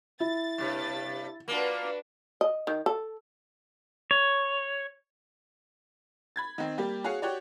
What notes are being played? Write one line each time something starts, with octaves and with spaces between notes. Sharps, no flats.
E4 A6
G2 C3
A#3 D4 F4 F#4 B4
D#5
D#3
A4
C#5
B5 G#6 A6
D#3 C4
G3 A#3 G4
F#4 G#4 C#5 F5 F#5
F#4 G4 C#5 D5